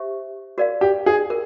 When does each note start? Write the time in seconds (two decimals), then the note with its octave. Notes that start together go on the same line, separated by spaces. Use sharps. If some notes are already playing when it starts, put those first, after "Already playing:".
Already playing: G4 C5 E5
0.58 F#4 A#4 D5 F5
0.81 G4
1.06 G#4
1.30 A#4